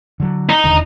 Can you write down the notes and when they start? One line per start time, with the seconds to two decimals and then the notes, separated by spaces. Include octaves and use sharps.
0.20 D3 F#3
0.49 D#4
0.64 E1 D#2 D3